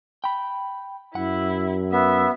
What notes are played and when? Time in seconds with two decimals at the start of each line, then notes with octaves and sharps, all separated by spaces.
0.24 G5 B5
1.15 F#2 E4 F#5
1.92 B3 E5